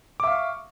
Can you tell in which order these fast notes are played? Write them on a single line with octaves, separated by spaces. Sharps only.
D6 E5 F5 C#6